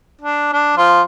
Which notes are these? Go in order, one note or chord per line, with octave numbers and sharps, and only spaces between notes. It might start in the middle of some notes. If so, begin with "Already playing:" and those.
D4
D4
F3 F4